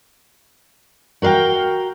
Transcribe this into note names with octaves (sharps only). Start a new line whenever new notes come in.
F#4 A#4 C5 F5 G5